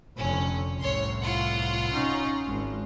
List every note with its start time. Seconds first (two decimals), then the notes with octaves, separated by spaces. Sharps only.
0.18 F1 D3 C#4
0.79 C2 A2 C#5 C6
1.21 F4 F#5
1.91 C#4 D#4
2.45 G#1 G#3